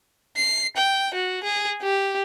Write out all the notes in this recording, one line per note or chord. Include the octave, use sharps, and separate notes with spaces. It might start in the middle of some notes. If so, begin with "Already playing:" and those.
C7
G5
F#4
G#4
G4